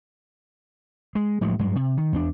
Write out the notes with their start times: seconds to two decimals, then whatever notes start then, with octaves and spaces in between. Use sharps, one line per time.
1.15 G#3
1.41 A2 F3 F#3 G#3
1.59 G2 F#3 G#3
1.75 C3
1.97 D#3
2.13 E2 D4